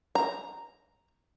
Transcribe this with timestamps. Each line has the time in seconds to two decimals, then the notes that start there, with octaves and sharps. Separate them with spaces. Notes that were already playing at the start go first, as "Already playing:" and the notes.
0.15 A#5